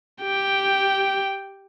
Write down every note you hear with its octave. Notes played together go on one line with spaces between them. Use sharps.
G4 G5